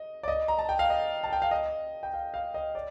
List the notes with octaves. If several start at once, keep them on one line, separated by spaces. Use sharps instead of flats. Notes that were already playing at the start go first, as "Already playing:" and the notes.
Already playing: D#5
D5
D#5
A#5
A5
G5
F5
D#5
A5
G5
F5
D#5
G5
F5
F5
D#5
D5